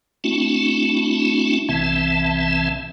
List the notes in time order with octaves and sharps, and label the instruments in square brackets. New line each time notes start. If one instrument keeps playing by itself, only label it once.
[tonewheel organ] A3 C4 D4 E4 F#4
B1 C3 E3 C4 E5 A5